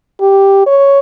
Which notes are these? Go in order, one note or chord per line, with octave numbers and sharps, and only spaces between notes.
G4
C#5